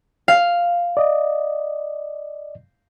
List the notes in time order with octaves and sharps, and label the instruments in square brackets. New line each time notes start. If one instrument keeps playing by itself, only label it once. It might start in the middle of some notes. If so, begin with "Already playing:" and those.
[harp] F5
[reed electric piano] D5 D#5